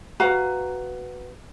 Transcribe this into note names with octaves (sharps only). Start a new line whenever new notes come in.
F#4 B4 F5 A#5